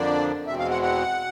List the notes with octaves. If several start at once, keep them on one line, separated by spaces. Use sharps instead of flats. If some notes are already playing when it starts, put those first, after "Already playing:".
Already playing: F2 D3 F3 A#3 D4 D5
E2 B2 G#3 C4 E5
F5
F#5
F#5